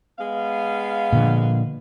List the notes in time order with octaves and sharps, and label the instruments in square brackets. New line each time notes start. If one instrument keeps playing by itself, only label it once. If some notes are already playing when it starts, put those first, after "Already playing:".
[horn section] G#3 B3 F5
[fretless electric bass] A#2 D3 F3